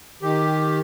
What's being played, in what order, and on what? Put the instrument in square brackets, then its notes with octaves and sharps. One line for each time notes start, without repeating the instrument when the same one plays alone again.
[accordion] D#3 G4